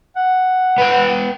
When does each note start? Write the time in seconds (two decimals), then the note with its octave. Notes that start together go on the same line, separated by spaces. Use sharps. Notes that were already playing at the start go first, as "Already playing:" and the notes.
0.16 F#5
0.78 B3 G5